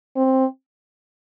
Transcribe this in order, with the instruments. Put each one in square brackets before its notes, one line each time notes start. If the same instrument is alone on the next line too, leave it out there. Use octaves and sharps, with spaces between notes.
[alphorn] C4